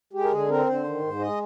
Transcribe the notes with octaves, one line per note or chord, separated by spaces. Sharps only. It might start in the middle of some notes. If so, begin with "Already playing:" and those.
G#3 G4
A#4
D3 G#4
C4 A#4
D3 C5
D#3
G#2
G#3 D#5